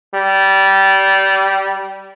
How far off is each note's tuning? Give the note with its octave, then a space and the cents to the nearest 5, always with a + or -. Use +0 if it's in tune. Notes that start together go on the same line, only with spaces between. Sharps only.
G3 -20